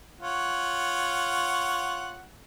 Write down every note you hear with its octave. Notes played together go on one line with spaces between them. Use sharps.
F4 C#5 F#5